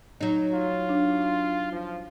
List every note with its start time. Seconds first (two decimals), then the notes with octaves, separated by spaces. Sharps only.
0.21 F#3 D#4
0.53 F4
0.89 D4
1.72 F3